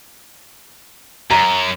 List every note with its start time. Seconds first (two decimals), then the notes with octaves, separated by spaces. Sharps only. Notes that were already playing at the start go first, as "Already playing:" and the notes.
1.31 F#2 A#5